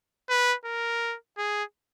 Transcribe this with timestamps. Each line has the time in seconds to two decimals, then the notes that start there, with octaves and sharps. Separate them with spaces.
0.29 B4
0.65 A#4
1.38 G#4